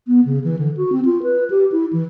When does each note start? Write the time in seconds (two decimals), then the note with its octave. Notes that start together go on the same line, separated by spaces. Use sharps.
0.07 B3
0.25 C#3
0.44 E3
0.59 D3
0.77 F#4
0.92 C4
1.05 F4
1.23 B4
1.50 G4
1.72 E4
1.93 E3